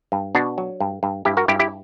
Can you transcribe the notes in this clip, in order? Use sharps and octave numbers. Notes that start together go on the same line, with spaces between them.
G2
B2 D4 F#4
F#3
G2
G2
G2 E4 G4
F#4 A#4
G2 E4 G4
E4 G4